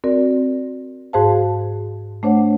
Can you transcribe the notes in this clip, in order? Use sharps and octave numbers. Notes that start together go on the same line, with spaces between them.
C4 F#4 A#4 D5
G#2 F#4 G#4 C5 F5 A5
A3 D4 C5 C#5 F#5